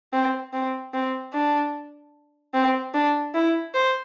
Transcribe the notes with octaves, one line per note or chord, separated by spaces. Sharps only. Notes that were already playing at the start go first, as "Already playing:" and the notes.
C4
C4
C4
D4
C4
D4
E4
C5